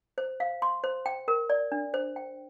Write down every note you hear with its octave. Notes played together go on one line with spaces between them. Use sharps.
C5
F5
C6
C5
G5
A#4
D5
D4
C5
G5